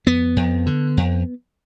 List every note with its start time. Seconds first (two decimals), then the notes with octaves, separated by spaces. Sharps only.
0.06 F2 B3
0.36 F2
0.66 D3
0.97 F2